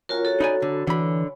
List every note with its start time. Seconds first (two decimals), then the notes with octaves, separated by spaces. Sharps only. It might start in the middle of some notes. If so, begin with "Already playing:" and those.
0.09 F#3 C#4 F4 F#4 A#4 F#5
0.25 F#4 A4
0.40 D#4 B4 D5 G#5
0.62 D3
0.87 D3 E3 B5